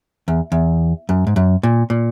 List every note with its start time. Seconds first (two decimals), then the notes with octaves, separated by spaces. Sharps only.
0.28 E2
0.52 E2
1.09 F#2
1.27 G#2
1.36 F#2
1.63 A#2
1.90 A#2